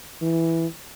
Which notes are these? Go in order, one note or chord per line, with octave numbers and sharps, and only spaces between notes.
E3